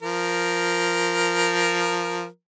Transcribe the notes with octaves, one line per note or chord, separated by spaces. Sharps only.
F3 A#4